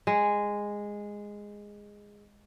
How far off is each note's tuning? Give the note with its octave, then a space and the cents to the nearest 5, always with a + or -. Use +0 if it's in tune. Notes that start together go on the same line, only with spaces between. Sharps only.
G#3 -10